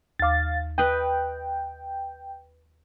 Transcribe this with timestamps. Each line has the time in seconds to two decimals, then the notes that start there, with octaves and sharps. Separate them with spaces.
0.19 D#2 F5 D6 A6
0.78 B4 D#5 G5